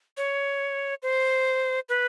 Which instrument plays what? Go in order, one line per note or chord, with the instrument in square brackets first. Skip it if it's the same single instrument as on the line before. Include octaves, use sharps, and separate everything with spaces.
[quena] C#5
C5
B4